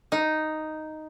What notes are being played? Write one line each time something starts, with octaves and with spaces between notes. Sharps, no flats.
D#4